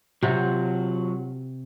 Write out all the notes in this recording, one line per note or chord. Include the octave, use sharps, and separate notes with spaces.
C3 F#3 F4 F#5